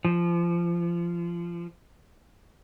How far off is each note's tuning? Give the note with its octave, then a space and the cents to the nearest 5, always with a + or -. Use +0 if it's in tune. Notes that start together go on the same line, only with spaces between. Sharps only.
F3 -25